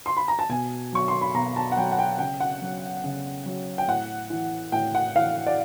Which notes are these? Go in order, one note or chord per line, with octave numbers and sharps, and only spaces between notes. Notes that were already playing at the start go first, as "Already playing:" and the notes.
C6
B5
A#5
A5
B2 G#5
F#3 C#6
C6
B5
B2 A#5
A5
F#5
F#3 G5
F#5
G5
C#3 G5
F#5
F#3
C#3
F#3
G5
A2 F#5
E3
A2 G5
F#5
E3 F5
D5